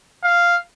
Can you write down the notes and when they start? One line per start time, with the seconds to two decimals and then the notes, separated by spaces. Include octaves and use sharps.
0.23 F5